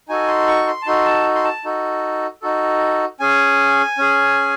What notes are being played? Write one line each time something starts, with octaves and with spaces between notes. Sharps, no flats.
D#4 F#4 A4 G#5
C6
C#6
C6
A5
D#4 F#4 A4 C6
A5
C6
A5
D#4 F#4 A4
D#4 F#4 A4
C#4 G#4 G#5
C#4 G#4